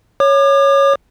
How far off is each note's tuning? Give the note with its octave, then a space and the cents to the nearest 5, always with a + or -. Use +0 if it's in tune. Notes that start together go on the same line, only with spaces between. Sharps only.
C#5 +0 D6 +40